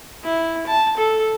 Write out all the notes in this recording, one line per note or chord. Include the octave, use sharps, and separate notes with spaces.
E4
A5
A4